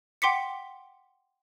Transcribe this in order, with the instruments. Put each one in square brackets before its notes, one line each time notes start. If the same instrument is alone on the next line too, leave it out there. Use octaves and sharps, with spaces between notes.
[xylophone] F#5 G5 C6 D6 B6 C#7